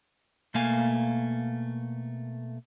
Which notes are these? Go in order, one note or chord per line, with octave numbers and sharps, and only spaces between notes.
B2 A3 A#3 F5 G#5